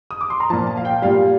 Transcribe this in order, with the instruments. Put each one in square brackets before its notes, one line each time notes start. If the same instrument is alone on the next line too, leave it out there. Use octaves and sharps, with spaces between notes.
[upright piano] D#6
D6
C6
A#5
F3 A5
A#2
A5
F5
G5
A#2 G3 F5